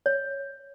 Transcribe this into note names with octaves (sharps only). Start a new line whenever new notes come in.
C#5